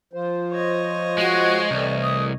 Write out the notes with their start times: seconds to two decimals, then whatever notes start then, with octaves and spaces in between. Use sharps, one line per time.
0.13 F3 F4 C5
0.52 C#5 D#5
1.18 G#3 F#4
1.71 C2 E3 A3 D5
2.02 D#6